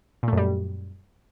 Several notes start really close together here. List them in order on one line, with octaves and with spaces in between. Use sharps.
A#2 A3 F#2 G3